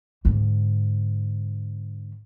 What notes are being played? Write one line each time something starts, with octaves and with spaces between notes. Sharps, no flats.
G#2 D3